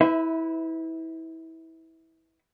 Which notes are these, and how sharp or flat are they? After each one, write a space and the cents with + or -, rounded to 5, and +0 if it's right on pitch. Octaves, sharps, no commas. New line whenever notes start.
E4 -25 B4 +25 E5 -10